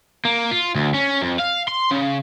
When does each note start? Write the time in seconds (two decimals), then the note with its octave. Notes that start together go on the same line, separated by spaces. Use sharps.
0.25 A#3
0.51 F4
0.75 D2
0.94 C#4
1.22 F2
1.40 F5
1.68 C6
1.91 C#3